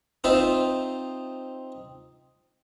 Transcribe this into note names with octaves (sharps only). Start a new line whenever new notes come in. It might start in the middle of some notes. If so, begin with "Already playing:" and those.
C4 D#4 F4 C5 E5